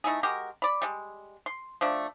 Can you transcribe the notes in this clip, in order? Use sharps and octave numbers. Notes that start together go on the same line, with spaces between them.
A3 D#4 E4 G#4
G#3 F#4 G4 A#4
D5 B5
G3 G#3
C6
F3 A3 D4